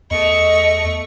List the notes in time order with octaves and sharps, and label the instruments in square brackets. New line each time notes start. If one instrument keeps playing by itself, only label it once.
[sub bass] E2 [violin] A3 C#6 [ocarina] D#5